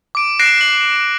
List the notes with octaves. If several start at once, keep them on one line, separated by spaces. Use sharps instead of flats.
D6 D7
F#6 A#6 C7 D7 E7
F#7